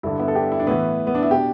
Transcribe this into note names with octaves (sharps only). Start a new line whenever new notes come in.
G2 D3 E4 A4
B3 E4
A4
D4 G4
E4
D4
A2 E3 B3 E4
B3
D4
E4
B2 D4 G4